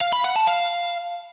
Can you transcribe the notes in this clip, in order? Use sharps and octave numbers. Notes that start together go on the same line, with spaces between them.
F5
B5
F#5
A5
F5